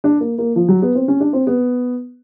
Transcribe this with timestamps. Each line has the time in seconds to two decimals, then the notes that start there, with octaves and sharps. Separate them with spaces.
0.04 D4
0.21 A#3
0.38 A#3
0.56 F3
0.68 F#3
0.82 B3
0.95 C4
1.08 C#4
1.20 D4
1.33 C4
1.47 B3